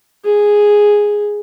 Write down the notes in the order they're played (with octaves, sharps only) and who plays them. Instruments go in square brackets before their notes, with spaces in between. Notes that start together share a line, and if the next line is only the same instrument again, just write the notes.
[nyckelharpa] G#4